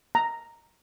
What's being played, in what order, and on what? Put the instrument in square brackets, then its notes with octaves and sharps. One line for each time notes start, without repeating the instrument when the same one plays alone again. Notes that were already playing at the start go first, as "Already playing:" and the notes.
[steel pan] A#5